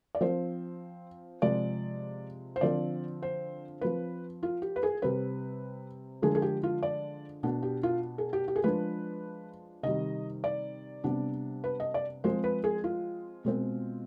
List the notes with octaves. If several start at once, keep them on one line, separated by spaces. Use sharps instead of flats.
D5
F3 C4 C5
C3 F3 G#3 D5
C5
D3 F3 C4 D5
C5
F3 C4 B4
F4
G4
B4
G#4
C3 G3 C4 B4
D3 F3 G#3 D4 G#4
G#4
G4
F4
D5
B2 B3 D4
G4
F4
G#4
G4
G4
G#4
F3 G#3 D4 B4
C3 D#3 G3 D#5
D5
C3 G3 B3 D4
B4
D#5
D5
F3 G#3 C4 C5
B4
G#4
F4
B2 G#3 C4